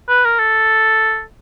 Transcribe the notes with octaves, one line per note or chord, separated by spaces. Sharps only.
B4
A#4
A4